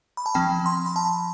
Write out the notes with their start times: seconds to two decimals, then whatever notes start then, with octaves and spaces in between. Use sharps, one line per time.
0.17 B5
0.26 A5
0.34 F3 C4 G5
0.66 C6
0.86 B5
0.96 A5